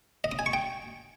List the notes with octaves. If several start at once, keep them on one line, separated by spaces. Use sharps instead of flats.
D#5
D#6
G#5
C#6
G5